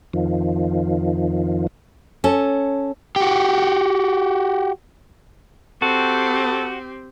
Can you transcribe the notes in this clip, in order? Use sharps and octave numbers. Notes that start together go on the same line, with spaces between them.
F2 D#3 F3
C#4 A4
F#4 G4
C4 F#4 G4 A4